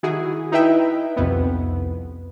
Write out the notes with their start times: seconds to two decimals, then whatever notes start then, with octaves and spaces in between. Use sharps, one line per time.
0.03 D#3 E4 F#4 G#4
0.52 D#4 E4 B4 E5 G5
1.16 C2 F2 B3